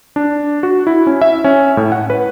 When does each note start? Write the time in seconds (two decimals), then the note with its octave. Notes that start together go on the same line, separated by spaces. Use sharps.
0.16 D4
0.63 F#4
0.87 E4
1.07 C#4
1.22 E5
1.44 C#4
1.77 A2
1.92 F#5
2.10 B4